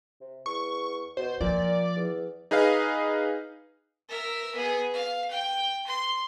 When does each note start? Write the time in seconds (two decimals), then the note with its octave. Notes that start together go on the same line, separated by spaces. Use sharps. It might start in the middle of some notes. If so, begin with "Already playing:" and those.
0.21 C3
0.46 E2 C#6
1.17 B2 C5
1.41 A#2 F3 D5
1.96 E2
2.51 D#4 G#4 B4 D#5 F5
4.09 A#4 E5
4.55 B3 G#4
4.94 F5
5.31 G5
5.87 C6